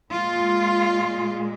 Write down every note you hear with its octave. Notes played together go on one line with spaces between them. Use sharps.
A#2 G#3 F4